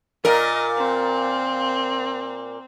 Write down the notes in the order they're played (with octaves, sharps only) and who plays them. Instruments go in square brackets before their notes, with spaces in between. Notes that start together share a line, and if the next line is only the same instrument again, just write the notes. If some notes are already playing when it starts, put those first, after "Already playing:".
[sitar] A#2 A#4 [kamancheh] D#5
[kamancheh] C4